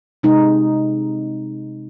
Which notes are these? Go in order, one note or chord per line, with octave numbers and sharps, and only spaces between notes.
C3 G#3 D#4